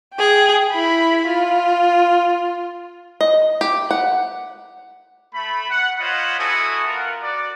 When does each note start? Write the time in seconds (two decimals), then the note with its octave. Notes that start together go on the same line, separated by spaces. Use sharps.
0.15 G#4 G5
0.70 E4 B5
1.27 F4
3.21 D#5
3.61 G4
3.91 F#5
5.34 A3 B5
5.70 F#5
6.00 F4 C5 C#5 D#5 F#5 B5
6.39 E4 F#4 A4 G#5 C#6 D#6
6.86 B3 F4 A#4 F#5
7.22 F#4 D5